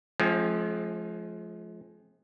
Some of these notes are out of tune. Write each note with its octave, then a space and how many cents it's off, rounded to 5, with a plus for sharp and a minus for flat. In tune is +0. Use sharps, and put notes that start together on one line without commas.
F3 +0 G#3 +45 C4 +40